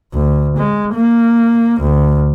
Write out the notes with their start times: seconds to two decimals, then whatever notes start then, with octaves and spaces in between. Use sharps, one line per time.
0.14 D2
0.57 G#3
0.94 A#3
1.81 D2